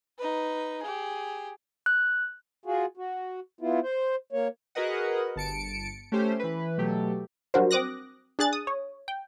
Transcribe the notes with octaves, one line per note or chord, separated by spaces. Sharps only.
D#4 B4
G4 G#4
F#6
F4 F#4 G#4
F#4
B3 E4 F4
C5
A#3 C#5
F#4 G#4 A#4 B4 D#5 F#5
G1 A5 C#7 D7
A3 C#4 G4 C5
E3 B4
B2 F#3 A3 G4
F#3 G3 D4 F#4 A#4 C5
C4 D6 D#6 F#6 A#6
D4 G#4 F#6 A6
D#6
C#5
G5